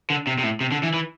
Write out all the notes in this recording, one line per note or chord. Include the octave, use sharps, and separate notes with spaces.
D3
C3
C3
A2
C3
D3
E3
E3